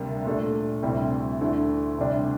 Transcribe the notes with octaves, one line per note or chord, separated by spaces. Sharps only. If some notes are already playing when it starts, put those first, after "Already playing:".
Already playing: D2 C3 G3 A#3 D4
A#2 A3 D4
D2 C3 G3 C4 E4
D2 D3 A3 E4
D2 C3 G3 D4